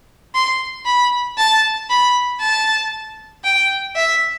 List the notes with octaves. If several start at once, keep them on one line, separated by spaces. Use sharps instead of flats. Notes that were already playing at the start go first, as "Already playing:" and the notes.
C6
B5
A5
B5
A5
G5
E5